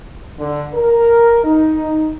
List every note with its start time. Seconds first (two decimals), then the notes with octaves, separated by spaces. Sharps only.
0.38 D3
0.73 A#4
1.44 D#4